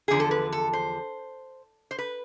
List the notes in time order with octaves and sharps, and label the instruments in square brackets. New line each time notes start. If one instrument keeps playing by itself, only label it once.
[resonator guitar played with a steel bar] E2 D3 F3 G#4
A4
B4
A4
C5
C5
B4